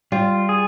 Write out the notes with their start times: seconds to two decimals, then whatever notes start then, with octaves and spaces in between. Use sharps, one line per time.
0.12 G3 F4
0.49 G#4